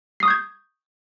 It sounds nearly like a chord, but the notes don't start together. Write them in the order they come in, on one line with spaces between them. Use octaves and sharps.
C7 D#6 C#6 G6 G#6